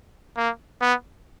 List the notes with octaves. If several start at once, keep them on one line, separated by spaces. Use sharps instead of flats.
A#3
B3